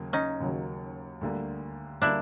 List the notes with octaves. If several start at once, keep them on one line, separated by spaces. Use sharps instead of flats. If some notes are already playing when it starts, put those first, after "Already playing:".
Already playing: D#2 C#3 F#3 A#3
C#4 D#4
D#2 C#3 F#3 A#3
D2 D3 G3 A#3
D3 G3 A#3 D4 E4